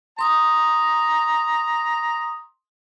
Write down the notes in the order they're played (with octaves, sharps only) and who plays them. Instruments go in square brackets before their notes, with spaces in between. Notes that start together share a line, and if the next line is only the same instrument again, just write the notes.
[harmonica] A#5 [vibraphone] C6 D#6